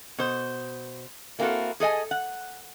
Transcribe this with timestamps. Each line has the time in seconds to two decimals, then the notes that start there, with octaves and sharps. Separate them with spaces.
0.18 B2 C5
1.39 G#3 A#3 C4 E4 F#4 A4
1.80 G#4 A4 D#5 G#5
2.11 F#5